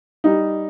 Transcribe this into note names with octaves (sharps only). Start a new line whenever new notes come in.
G3 D#4